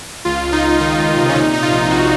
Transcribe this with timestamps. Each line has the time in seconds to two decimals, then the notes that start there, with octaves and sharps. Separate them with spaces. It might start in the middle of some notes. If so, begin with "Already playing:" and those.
0.25 C#2 F4
0.44 C#2
0.53 D#4
0.62 C#2
0.80 D#3 D#4
0.99 C#2
1.17 C3
1.29 C#4
1.35 A#2 D#4
1.53 A#2 D#4
1.63 F4
1.72 A#1
1.79 F4
1.91 A#1 F#4